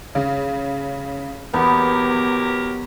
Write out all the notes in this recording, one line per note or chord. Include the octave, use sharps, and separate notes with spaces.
C#3
E2 F#3 B3 G4 A#4